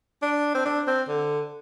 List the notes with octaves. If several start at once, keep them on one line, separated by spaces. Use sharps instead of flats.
D4
C4
D4
C4
D3